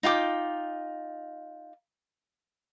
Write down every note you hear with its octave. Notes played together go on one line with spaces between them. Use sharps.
D#4 F4 G5 D6